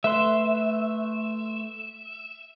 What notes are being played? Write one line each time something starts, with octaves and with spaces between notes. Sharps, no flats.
A3 B4 E5 C6